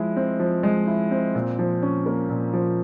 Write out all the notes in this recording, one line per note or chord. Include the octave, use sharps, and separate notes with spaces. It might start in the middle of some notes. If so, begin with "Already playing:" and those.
Already playing: F3 G#3 E4
C4
F3
G#3
E4
C4
A#2
F3
C#4
A#3
A#2
F3